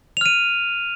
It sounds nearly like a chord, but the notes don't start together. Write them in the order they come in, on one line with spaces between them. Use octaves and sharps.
F7 F6 D#7